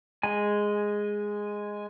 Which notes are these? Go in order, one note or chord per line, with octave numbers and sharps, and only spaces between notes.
G#3 G#5